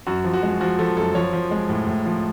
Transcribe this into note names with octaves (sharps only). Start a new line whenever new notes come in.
F#2 F#4
F3
F#4
G#3
F3 F#4
F3 A4
F#2 A4
F3 C#5
F3
G#3
A2
A2
F3